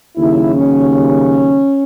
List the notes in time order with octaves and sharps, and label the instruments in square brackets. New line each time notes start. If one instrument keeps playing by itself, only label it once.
[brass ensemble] D#2 C#3 F#3 E4
C#4